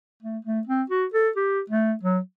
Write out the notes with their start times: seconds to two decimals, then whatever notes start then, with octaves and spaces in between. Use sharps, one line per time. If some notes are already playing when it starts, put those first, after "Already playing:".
0.23 A3
0.45 A3
0.67 C4
0.90 F#4
1.14 A4
1.36 G4
1.70 A3
2.03 F#3